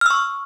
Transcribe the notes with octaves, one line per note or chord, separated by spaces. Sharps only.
C#6 E6 F6